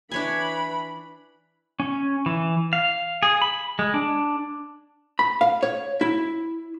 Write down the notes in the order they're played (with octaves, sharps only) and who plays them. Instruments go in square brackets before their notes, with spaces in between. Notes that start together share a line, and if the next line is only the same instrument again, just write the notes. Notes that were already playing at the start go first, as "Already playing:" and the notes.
[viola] E3 B5 [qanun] D4 C#5 G#5
[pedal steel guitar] C#4
E3
F5
G#4
B5
G#3
D4
[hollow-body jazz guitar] B5
F5
C#5
E4